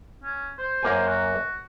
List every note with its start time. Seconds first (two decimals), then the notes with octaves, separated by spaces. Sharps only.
0.24 C#4
0.58 C5
0.83 F#2 A#3 G#5
1.07 F#4